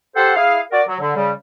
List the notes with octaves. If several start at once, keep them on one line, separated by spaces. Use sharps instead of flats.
G4 A4 C5 F#5
E4 G#4 F5
F#4 A#4 D5
F#3
D3
C#3 G3